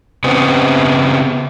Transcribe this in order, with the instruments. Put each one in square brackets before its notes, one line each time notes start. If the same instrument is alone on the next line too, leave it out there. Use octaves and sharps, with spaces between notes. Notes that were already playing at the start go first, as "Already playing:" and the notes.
[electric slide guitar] C#3 B3 C4